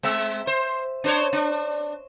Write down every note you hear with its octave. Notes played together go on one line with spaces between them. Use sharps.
G#3 C4 E5
C5
D4 C5 C#5
D4